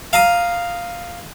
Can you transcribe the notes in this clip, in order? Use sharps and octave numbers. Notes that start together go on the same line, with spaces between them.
F5 A#5 D#6